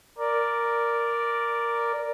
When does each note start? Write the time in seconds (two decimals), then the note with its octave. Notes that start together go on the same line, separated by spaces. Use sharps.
0.18 A#4 D5